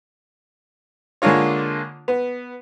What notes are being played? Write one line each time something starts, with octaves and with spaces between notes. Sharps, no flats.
D3 G#3 A#3 D4 F4 C#5
B3